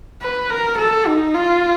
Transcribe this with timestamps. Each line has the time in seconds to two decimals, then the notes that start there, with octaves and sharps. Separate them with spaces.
0.22 B4
0.50 A#4
0.78 A4
1.07 D#4
1.35 F4